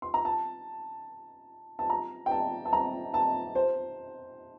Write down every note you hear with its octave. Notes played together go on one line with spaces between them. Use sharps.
C6
A#5
A5
A5
A#5
G5
A5
A5
A#5
A5
C5